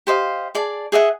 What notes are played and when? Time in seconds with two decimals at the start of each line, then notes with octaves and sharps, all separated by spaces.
0.07 G4 C5 D#5 F5
0.55 G#4 D5 A5
0.92 G#4 D#5 E5 F#5